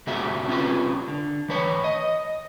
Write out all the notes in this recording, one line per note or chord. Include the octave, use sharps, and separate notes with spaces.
C#3 A3 A#3 F#4 G4 E5
C4 C#4 F4 G4 B4
D3
E3 B4 C#5
D#5